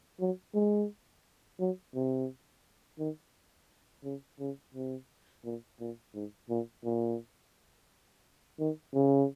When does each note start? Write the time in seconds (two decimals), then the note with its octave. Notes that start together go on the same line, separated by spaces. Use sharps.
0.20 F#3
0.55 G#3
1.60 F#3
1.95 C3
2.99 D#3
4.04 C#3
4.40 C#3
4.74 C3
5.45 A#2
5.80 A#2
6.15 G#2
6.50 A#2
6.84 A#2
8.59 D#3
8.94 C#3